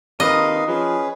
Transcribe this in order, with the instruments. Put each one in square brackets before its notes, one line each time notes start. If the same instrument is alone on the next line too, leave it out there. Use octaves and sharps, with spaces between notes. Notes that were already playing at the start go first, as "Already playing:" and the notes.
[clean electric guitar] C3 D#3 [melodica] A#4 B4 F5 [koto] D#5
[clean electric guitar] F3 [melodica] C#4 G#4 B4